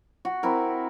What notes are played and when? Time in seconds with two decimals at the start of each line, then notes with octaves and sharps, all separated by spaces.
0.25 F#4
0.43 C4 E4 A#4